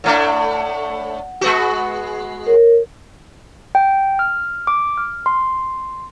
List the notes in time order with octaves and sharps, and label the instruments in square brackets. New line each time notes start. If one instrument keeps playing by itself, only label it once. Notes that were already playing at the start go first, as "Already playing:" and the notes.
[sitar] A2 A3 D4 [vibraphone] F#5
[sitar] G#3 B3 F#4
[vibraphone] A#4 C#5
[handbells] G5
F6
D6
F6
C6